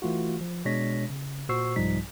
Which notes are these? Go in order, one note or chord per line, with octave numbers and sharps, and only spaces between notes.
E3 A3 F4 F#4
F3
B2 G#3 D4 C#5 A#6 B6
C#3
A#2 F#4 C5 C#6 E6 C7
C2 G#2 F3 G3 D#4 B6